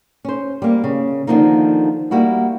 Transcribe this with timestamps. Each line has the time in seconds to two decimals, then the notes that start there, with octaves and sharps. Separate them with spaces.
0.25 C#4 C5
0.62 G3 A#3
0.84 C#3
1.27 D3 D#3 F3 A#3 D#4
2.11 G3 A#3 E4 F#4